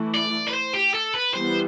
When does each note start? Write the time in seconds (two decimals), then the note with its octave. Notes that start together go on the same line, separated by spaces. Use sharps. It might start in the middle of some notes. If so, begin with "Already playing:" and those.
Already playing: E3 A3 E4
0.14 D5
0.48 B4
0.54 C5
0.74 G4
0.94 A4
1.14 B4
1.34 E3 G3 B3 C5